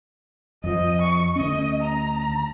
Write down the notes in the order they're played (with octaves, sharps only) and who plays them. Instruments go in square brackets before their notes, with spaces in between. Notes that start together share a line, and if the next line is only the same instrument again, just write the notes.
[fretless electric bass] F2 F3 [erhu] D#5
[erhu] C#6
[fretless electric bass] D2 C#4 [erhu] D#5
[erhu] A#5